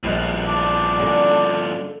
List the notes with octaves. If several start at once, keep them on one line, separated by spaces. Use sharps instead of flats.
A#1 G2 F3 G#3 F#6
D4
D3 A#3 C#4 A4